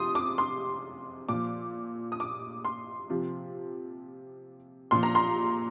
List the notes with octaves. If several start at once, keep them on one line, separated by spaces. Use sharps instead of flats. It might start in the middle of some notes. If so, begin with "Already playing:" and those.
Already playing: C3 F3 C6 D#6
D6
C6
A#2 F3 D6
D#6
D6
C6
C3 F3
A#2 F3 C6
A#5
C6